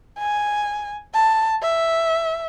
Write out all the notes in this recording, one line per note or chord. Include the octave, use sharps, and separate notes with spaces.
G#5
A5
E5